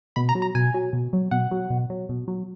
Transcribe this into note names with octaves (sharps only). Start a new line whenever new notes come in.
B2 B5
A#5
F#3
A#5
B2 G#5
F#3
B2
F#3
B2 F#5
F#3
B2
F#3
B2
F#3